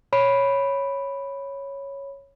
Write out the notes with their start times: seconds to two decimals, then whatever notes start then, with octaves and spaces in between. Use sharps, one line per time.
0.13 C#5 B5 D7